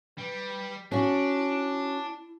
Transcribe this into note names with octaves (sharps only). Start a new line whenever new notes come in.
G3 B4
C#4 D4 E4 F#4